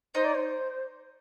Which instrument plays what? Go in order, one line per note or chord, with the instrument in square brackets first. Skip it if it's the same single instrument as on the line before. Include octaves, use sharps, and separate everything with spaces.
[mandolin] D#4 [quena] C5
[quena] D5
C5